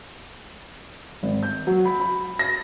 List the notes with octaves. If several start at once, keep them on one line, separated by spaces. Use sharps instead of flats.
G#1
G6
F#3
B5
B5
A#6